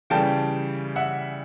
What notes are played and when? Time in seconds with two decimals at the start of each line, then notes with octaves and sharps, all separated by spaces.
0.10 C#3 E3 G3 G5 A5
0.96 E5 F#5